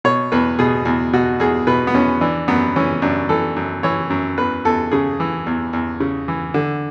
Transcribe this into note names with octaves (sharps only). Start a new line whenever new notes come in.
B2 C#5
E2 B4
B2 G#4
E2
B2 F#4
E2 G#4
B2 B4
B3
E2 C#4
E3 D4
F#2 B3
E3 C#4
F#2 D4
E3 A4
F#2
E3 C#5
F#2
E2 B4
E2 A4
C#3 G#4
E3
E2
E2
C#3
E3
D3